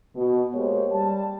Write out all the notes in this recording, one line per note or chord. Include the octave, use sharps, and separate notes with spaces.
B2
G#3 A#3 G4 C5 C#5
G3 A5